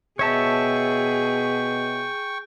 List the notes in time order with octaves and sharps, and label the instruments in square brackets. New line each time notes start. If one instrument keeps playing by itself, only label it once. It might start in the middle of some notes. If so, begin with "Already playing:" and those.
[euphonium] B2 [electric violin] G#4 [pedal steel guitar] C#5 E5 A5 [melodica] G5 C#6